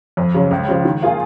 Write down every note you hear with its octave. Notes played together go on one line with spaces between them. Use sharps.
F2
C#3 F#3
C#2
C#3 F3
D#3
A#3 F4 G#4